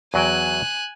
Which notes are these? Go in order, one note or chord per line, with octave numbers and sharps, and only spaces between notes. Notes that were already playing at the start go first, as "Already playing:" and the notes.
E2 F#3 G5 G#5 F#6